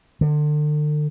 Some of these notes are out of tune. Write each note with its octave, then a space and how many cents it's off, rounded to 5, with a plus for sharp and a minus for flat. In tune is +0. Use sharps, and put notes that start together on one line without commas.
D3 +35